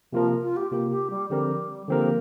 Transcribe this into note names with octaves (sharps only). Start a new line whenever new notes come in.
C3 F3 A#3 F4 A#4
F4
G4
C3 A#3 F4 G4 A#4
G4
G3
D3 F3 G3 C4 G4 A#4
D3 F3 A#3 C4 G4 A#4